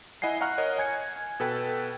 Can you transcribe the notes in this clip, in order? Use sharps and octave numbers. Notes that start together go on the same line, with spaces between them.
E4 D#5 F#5 G#5 C7
F5 F#5 A#5 C#6 F6 F#6
A#4 C#5 D#5
G#5 G#6 C#7
B2 A4 B4 G5 G#6